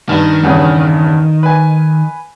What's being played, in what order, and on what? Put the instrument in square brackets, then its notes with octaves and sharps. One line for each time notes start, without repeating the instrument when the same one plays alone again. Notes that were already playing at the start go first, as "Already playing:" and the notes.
[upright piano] G2 B4 [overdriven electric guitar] D#3
[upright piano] E2 G2 C#3
B4 G#5